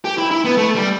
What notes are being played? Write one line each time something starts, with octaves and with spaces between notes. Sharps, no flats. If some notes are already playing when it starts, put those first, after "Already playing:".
G4
E4
E4
B3
A3
G3